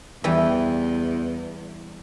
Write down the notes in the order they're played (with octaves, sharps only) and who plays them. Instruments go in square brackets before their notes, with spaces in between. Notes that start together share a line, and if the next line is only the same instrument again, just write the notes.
[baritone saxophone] E2 [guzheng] E3 G3